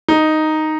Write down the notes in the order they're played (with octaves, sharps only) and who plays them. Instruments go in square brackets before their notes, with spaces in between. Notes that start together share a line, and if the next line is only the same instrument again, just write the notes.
[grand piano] D#4